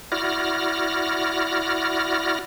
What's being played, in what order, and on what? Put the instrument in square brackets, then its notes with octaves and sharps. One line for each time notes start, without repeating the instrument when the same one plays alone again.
[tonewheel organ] E4 F#4 D5 F6 A#6